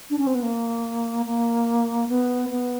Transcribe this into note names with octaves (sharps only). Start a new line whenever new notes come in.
D4
C#4
C4
B3
A#3
A#3
B3
B3